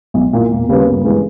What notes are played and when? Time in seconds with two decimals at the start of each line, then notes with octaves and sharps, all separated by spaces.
0.14 B1
0.33 A#2 A#3 E4
0.51 E1
0.69 D#2 C#3 G3 B3
0.87 G1
1.04 G2 E3 G#3 B3